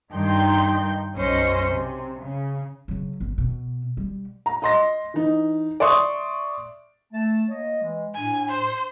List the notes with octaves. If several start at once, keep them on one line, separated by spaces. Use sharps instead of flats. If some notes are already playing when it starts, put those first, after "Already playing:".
G2 D#3 D#4 G5 C6 G6
B1 F#2 C#4 C5 D#5 C#7
C3
C#3
C#3 F#3
G1
B2
G3
A#5
D#5 C6 A#6
E3 D#4
D5 E5 C6 C#6 D#6
A3 A5
A#3 C#5 D#5
E3 G#3
A2 D4 G#5
C5